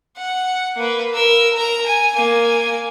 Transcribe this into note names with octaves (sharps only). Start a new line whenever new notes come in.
F#5
A#3 B4
A#4 E6
A#4 A#5
G#5
A#3 G#5